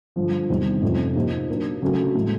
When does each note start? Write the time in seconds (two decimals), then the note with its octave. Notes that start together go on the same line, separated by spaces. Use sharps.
0.16 G2 D3 F3
0.50 E2 C3 D#3 G3 C4
0.82 F2 C3 F3 A3 C#4
1.15 A#2 F3 A#3 D#4 G4
1.49 F#3 A#3 D4
1.82 C#3 F#3 A3 C#4 F#4
2.15 A2 E3 G#3